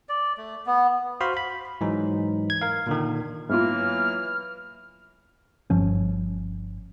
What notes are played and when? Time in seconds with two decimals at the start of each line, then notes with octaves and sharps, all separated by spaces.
0.09 D5
0.38 A3
0.66 B3
1.21 F#4 C5 F5 B5
1.37 B5
1.81 G#2 E3 F#3 D#4
2.50 G#6
2.62 A#4 F5
2.87 A#2 D3 D#3
3.50 G#2 E3 F#3 A#3 B3 F4 F6
5.70 G1 F3 C#4